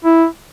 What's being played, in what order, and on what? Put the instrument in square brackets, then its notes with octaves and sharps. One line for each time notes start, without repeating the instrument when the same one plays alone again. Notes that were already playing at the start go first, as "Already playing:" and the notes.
[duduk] E4